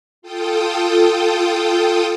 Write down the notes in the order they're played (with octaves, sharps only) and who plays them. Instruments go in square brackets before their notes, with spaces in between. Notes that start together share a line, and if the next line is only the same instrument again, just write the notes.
[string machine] F4 A4 G5 D#6